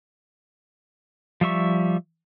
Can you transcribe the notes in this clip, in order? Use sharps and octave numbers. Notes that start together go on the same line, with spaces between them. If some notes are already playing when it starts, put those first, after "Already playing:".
F3 G3 E5 C#6